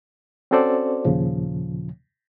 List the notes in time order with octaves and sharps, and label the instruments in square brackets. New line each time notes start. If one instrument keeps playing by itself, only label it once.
[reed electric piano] C4 C#4 F#4 A4 C5 D5
D#2 A#2 C#3 F3